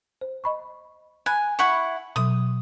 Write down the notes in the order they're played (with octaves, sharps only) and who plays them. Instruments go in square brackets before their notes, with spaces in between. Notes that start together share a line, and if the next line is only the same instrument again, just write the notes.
[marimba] C5
D#5 B5 C#6
[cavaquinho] G#5 [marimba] B5 F#6
[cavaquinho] E4 F#5 C#6
[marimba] B2 F#3 [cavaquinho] D#6